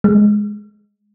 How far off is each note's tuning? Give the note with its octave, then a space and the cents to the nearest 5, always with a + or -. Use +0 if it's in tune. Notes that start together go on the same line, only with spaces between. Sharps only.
G#3 +0